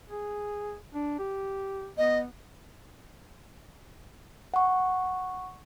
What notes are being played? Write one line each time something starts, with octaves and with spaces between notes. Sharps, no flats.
G#4
D4
G4
B3 D#5
F#5 C#6